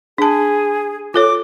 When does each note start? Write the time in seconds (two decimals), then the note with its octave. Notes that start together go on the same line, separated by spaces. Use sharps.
0.18 D4 G#4 A5
1.14 F4 A4 C#5 D6